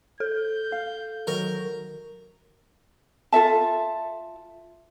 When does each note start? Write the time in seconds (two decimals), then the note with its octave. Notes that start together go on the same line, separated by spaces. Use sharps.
0.20 A4 G6
0.72 F5
1.27 D#3 F#3 A#4
3.32 F4 A4 E5 A5